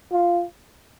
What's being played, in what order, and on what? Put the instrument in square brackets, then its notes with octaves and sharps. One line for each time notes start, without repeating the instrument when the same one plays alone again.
[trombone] F4